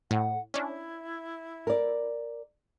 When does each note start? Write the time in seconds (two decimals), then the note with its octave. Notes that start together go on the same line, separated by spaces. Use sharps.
0.11 A2 F#5
0.54 C#4 D4 E4
1.67 A#4 D5